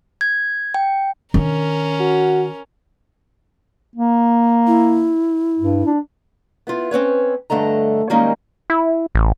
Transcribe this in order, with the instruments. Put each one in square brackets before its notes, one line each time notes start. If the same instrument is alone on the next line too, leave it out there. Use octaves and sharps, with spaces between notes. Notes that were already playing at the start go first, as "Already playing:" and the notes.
[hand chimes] G#6
G5
[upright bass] D#3 D4 [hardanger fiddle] C#4 A#4
[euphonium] F#4
[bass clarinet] A#3
[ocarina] E4
[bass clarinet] G2
D4
[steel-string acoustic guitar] B3 E4 F4
C4 C#4 B4 C#5
G2 D3 A3 D#5 A#5
D#3 G3 G#3 A#3 C#4 D#4
[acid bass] E4
A1